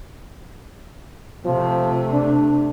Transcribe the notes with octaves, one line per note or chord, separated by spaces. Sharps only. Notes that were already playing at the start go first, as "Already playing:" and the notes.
C3 F3 A3
D4